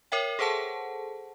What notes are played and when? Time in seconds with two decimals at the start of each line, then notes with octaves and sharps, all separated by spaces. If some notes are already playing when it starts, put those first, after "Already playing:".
0.12 A#4 C#5 E5 G5
0.39 G#4 A4 C5 F#5 A5